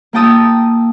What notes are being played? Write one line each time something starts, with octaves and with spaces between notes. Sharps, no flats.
A#3 F4 G5 A5 D#6 E6